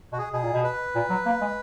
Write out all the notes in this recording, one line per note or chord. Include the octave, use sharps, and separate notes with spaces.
B2 F#4
G#4
B2 G#4
A#2
B2
B4
A#2
F#3
A#3
G#3